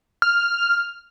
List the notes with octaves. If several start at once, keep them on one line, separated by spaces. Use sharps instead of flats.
F6